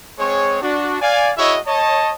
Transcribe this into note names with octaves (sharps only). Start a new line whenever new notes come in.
G#3 C4 G#4 C#5
D4 F#4
D5 F5 G#5
E4 F#4 G#4 C#5 D#5 E5
C#5 D#5 A5